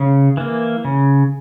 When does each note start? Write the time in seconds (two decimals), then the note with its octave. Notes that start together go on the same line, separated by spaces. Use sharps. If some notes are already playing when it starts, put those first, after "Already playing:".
Already playing: C#3
0.37 E3 A#3
0.85 C#3